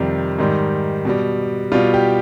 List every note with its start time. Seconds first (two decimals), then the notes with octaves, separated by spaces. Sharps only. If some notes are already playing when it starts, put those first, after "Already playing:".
Already playing: F2 C3 D#3 G3 G4
0.39 G#2 D#3 G3
1.05 B2 G3
1.72 B2 G3 F4
1.94 G4